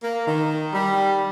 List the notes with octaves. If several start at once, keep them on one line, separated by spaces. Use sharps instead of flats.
A#3
D#3
G3